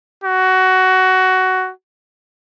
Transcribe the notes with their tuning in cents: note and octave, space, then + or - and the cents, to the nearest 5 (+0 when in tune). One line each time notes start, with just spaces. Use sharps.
F#4 +15